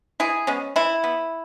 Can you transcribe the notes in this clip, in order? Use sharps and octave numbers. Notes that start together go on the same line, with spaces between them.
E3 E4 G#4
G#3 B3 C#4
E3 E4
B3